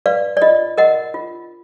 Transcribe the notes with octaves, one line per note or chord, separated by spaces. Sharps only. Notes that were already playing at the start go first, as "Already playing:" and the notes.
B4 D5 F5
D5
F4 D#5
A#4 D#5 F#5
F4